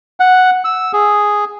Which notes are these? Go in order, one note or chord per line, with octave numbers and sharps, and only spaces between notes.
F#5
E6
G#4